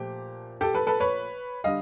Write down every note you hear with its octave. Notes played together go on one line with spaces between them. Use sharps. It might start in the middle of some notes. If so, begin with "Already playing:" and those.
Already playing: A#2 F3 A3 G4
G4 A4
A4 B4
A4 B4
B4 C#5
D3 G3 D#5 F5